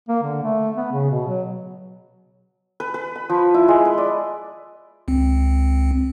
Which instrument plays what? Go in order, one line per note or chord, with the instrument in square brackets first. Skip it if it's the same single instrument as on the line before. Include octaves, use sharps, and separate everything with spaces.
[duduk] A#3
D3
A3
B3
C#3
B2
F#3
[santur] B4
B4
B5
F3
E4
G#3
B4
D5
[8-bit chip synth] C#2 C4